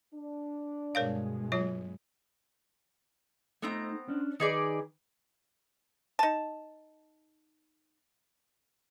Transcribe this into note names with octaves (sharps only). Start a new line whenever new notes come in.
D4
G2 B2 G#3 A#4 C#5 F5
F#3 F4 C#5
A3 B3 C4 D#4 A#5
C#4 D4
D#3 D#4 G#4 B4 D5
D#4 A5